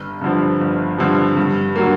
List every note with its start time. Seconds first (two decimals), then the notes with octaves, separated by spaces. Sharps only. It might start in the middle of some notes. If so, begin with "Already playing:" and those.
Already playing: G1
0.21 G2 D3 F3
0.61 G1
0.98 G2 D3 F3
1.37 G2
1.76 D3 F#3 A#3